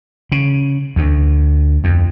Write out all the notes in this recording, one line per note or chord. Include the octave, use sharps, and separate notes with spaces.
C#3
D2
F2